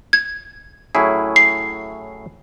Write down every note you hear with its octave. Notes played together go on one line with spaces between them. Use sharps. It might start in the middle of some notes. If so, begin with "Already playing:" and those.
G#6
A2 F#3 C#4 E4 G#4
C7